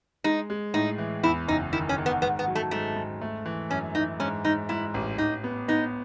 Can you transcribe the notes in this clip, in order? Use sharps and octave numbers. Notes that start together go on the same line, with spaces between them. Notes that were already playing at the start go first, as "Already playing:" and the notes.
G#3 D#4
G#3
A2 D#4
E3
E2 E4
F#1 D#4
D#3 E4
C#4
D#3
B3
G#2 B3
B3
F#3
A3
G#2 A3
G#2
A3
E3
F#2 C#4
E3 D#4
G#2 C#4
G#2 D#4
G#2 E4
A1
A1 D#4
B3
B3 D#4